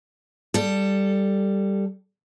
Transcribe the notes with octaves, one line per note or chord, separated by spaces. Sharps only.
G3 A4